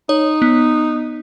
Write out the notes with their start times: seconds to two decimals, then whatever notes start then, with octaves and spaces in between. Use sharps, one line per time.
0.09 D#4 C#5
0.42 B3